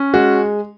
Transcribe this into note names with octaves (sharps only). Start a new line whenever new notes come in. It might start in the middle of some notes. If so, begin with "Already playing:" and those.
Already playing: C#4
G#3 F#4